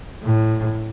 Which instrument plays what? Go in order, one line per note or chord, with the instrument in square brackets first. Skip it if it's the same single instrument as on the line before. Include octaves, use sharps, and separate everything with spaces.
[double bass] A2